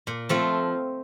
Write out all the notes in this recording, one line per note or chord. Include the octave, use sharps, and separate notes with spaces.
A#2
F3 A3 C4 F4